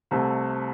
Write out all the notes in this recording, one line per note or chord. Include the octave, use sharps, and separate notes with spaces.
C2 C3 A3